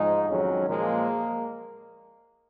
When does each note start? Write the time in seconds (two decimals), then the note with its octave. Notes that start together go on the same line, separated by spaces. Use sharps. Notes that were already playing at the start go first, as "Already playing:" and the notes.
Already playing: G#2 F3 G#3 D#4
0.29 F2 D#3 F#3 C#4
0.68 A#2 F3 G#3 A#3